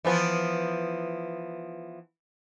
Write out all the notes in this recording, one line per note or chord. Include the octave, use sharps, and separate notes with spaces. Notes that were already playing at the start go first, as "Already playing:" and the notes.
E3 F3 B3